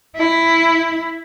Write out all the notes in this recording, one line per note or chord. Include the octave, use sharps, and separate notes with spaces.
E4